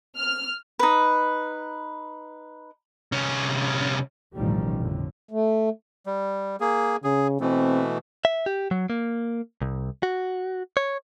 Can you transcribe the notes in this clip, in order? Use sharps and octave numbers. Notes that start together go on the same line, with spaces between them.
F6
D#4 B4
C2 C#4
A1 D2 B2 D#3 F3 G3
F2 A2 D3
A3
G3
A#3 G#4
C#3 G#4
B2 E3 A3 C4
E5
G4
F#3
A#3
C2
F#4
C#5